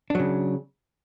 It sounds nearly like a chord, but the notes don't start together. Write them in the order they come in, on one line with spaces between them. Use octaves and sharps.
D4 F#3 C#3